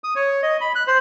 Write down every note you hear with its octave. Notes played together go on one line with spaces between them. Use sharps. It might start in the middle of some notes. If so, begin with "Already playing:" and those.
D#6
C#5
D#5
B5
F#6
C5